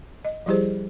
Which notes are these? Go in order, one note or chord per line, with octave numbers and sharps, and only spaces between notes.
D#5
F3 G3 E4 G4 G#4 C5